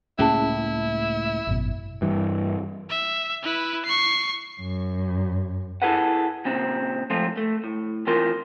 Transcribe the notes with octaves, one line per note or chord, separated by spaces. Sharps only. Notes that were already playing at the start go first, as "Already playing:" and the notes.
C#2 A2 A#3 C#4 E4 G#4 A5
G#1 F#2 B2
G2 E3
E5
E4 B4
C#6 C7
F#2
E4 G#4 A4 B4 F#5
A#2 C#3 C4
G#2 F3 A3 C4 F4
A3
A2
E3 C4 F4 A#4 C6